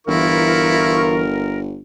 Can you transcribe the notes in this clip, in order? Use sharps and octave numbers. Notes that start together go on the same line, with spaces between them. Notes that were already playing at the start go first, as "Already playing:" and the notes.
G1 E3 E4 F4 A#4 C#6